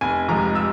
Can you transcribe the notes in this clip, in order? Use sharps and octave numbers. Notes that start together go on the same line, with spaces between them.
F1 G#5
F2 C3 F3 G#3 A#5
E6